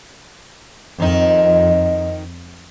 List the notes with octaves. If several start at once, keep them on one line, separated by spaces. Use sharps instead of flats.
F2 D#3 D#4